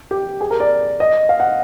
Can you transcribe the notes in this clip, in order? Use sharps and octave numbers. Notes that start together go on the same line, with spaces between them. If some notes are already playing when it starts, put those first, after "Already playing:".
G4
G#4
A#4
D5
D#5
F5
F#5